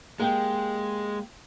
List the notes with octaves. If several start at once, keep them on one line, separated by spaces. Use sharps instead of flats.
G#3 A#3 G4 G5